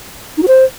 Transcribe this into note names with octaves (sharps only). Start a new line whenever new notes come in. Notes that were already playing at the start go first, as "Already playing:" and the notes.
D#4
F#4
C5